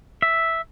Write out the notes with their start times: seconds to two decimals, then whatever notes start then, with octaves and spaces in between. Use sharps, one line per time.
0.22 E5